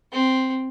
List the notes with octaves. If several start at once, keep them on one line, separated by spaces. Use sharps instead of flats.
C4